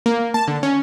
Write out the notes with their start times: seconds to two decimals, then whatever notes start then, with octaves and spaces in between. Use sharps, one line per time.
0.06 A#3
0.34 A5
0.48 D3
0.63 C#4